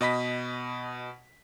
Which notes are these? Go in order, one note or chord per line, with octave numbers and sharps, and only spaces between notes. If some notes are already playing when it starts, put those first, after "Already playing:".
B2 D#5 B5 B6